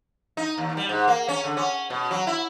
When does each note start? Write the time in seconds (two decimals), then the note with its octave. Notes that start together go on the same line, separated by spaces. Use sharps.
0.37 D#4
0.58 D#2
0.77 G3
0.89 G#2
1.08 A#3
1.28 C#4
1.44 D3
1.57 C#4
1.90 B2
2.11 F#3
2.27 E4